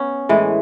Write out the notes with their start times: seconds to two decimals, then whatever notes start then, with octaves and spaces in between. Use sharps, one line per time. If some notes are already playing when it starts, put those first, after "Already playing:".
Already playing: B3 C#4
0.29 A2 E3 G#3